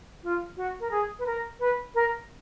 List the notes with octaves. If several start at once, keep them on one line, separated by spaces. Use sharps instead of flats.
F4
F#4
A#4
G#4
B4
A#4
B4
A#4